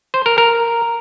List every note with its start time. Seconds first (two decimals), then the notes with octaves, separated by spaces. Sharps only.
0.14 C5
0.26 A#4
0.38 A#4